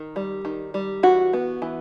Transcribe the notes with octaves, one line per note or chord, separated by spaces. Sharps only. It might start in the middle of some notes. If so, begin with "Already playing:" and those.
Already playing: D#3
G3
D#3
G3
E3 F#4
B3
E3